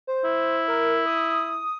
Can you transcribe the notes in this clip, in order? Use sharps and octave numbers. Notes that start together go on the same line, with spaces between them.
C5
E4
A#4
D#6